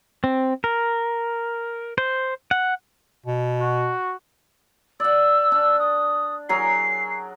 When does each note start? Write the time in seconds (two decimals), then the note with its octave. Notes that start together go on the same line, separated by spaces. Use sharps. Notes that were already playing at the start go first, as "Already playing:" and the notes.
0.24 C4
0.64 A#4
1.98 C5
2.51 F#5
3.26 B2
3.61 F#4
5.00 D5 F#5 E6
5.52 D4
5.79 D#6
6.49 F#3 G#4 A#4 C7